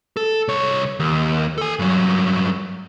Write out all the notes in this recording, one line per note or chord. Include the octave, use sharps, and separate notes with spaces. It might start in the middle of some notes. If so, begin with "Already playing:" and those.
A4
C2 C#5
D#2
A4 G#5
G2 F#3